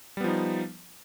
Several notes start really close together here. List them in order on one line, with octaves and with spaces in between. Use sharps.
G3 B3 F3 D#4